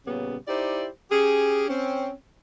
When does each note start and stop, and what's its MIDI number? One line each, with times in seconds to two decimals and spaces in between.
0.06 0.36 46
0.06 0.36 49
0.06 0.36 55
0.06 0.36 59
0.06 0.36 61
0.47 0.87 63
0.47 0.87 64
0.47 0.87 67
0.47 0.87 72
0.47 0.87 74
1.11 1.65 61
1.11 1.65 67
1.11 1.65 68
1.68 2.12 60
1.68 2.12 61